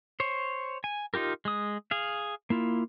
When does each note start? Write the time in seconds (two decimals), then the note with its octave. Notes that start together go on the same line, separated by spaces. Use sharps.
0.20 C5 C#5
0.84 G#5
1.14 D#4 F4 G4 A#4
1.45 G#3 D#6
1.91 G#4 F5
2.50 A#3 E4 F4